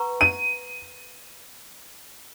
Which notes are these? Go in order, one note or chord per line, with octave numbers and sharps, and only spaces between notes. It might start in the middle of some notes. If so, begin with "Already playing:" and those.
Already playing: B4 F#5 A#5 C#6
D#7